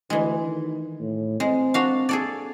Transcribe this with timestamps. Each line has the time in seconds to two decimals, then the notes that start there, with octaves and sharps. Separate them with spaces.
0.10 D2 E3 G#3
0.47 D#3
1.00 A2
1.40 G#3 C4
1.74 D4 F#4 F5
2.09 G#4 A4 D5